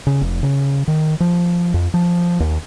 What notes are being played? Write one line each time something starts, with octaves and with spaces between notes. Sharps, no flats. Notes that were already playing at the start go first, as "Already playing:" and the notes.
C#3
F1
C#3
D#3
F3
F2
F3
D#2